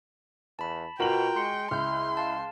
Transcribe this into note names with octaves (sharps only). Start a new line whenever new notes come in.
E2 A5 B5
B2 F4 F#4 A#4 G5 A#5 F#7
G#3 C6 C#7
C#2 E4 C6 F6 G6
F5 A5